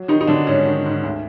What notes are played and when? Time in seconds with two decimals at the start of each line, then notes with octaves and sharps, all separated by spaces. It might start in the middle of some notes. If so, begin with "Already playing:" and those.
Already playing: F#3
0.08 D#3 D#4
0.21 D#4
0.27 D3 F#3 D4
0.47 G#2 C#4
0.65 D#3
0.85 G#2
1.03 D2